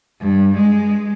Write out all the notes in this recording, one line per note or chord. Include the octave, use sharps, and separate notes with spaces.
G2
G#3